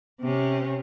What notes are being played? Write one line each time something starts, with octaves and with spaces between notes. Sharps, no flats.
C3 C#4